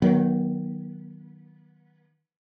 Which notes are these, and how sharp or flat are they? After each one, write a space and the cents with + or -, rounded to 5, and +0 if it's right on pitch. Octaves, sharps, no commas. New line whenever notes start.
D#3 +0 F#3 +15 B3 -25